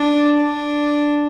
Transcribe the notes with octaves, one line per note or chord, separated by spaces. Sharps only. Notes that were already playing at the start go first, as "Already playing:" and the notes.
Already playing: D4
D4